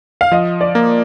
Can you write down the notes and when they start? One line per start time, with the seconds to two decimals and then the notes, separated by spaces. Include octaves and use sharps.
0.21 F5
0.32 F3 D#5
0.61 D5
0.75 A#3